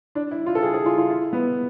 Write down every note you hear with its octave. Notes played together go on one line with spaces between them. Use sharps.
D4
E4
F4
A4
G#4
G#4
F4
F4
E4
B3